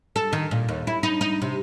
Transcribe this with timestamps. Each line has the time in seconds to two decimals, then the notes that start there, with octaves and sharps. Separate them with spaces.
0.16 A4
0.33 D#3
0.51 A#2
0.68 D#2
0.87 E4
1.03 D#4
1.21 D#4
1.42 C3